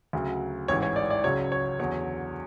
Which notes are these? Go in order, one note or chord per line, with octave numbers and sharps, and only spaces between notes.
D2 C#3 F#3
A1 G#2 E3 C#5
C#5
D5
D5
C#2 C#3 F#3 C#5
C#5
E2 D3 F#3 C#5